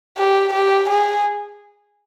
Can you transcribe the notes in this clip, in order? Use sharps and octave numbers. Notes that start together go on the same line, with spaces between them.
G4
G4
G#4